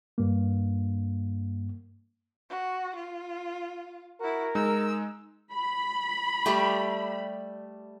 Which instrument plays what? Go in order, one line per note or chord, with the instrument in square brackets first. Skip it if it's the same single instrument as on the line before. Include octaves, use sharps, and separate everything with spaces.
[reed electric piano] G2 A#3
[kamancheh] F#4
F4
[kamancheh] E4 F#4 [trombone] A#4
[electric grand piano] G#3 D#4 [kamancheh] E6
[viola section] B5
[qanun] G3 A3 D5